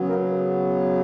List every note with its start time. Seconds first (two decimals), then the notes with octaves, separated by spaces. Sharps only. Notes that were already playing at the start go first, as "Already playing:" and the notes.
Already playing: C#3 F#3 B3
0.08 A#3 A#4